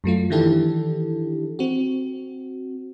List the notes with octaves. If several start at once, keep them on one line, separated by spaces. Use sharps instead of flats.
F#2 F#3 A3 F4
D#3 E3 D4 E4 G4 A4
C4 F#4